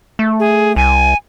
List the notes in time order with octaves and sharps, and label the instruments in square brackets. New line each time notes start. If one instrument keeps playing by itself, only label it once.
[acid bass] A3
[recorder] G#4
[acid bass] C2 [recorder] G#5